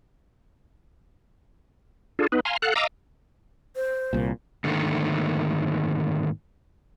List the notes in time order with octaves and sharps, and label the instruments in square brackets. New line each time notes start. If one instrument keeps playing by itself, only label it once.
[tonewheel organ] D4 F4 G#4 A4
B3 D#4 B4
F5 G#5 A#5 C6
A4 F5 F#5 F#6
D#5 F5 A#5 D6 E6
[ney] C5
[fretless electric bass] C2 A#2
[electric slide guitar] G#2 D3 D#3 F#3 A3 A#3